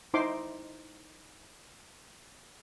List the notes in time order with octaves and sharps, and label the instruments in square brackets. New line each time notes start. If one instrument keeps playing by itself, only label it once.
[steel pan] D#4 E4 C5 C6 D6